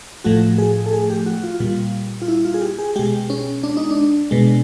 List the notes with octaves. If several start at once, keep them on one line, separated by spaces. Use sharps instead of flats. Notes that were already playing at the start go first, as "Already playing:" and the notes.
A2 F3 A3 F#4
G#4
A4
G#4
G4
F#4
F4
A#2 G3 F4
F4
E4
F4
G#4
G4
G#4
B2 G#3 G4
C#4
D4
D#4
D4
B2 G#3